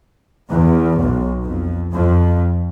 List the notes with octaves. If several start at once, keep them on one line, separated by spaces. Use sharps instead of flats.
E2
B1
F2
F2